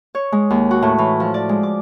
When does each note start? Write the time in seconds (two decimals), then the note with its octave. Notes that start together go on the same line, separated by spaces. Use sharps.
0.15 C#5
0.32 G#3
0.50 D#2
0.71 F#4
0.82 A2
0.98 E3
1.20 F3
1.34 D5
1.49 G#3
1.63 D6